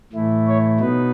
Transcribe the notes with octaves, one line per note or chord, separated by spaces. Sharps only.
A2 E3 A3 E4
C#5
B2 F#3 B3 D#4 B4